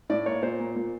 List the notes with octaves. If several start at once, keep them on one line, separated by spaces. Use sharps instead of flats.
A2 D5
A#3 C#5
A#2 C5
A#2
A#2